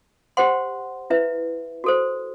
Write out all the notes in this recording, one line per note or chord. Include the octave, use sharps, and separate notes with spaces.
G4 C5 F#5 C6
E4 B4 E5
F#4 A4 C5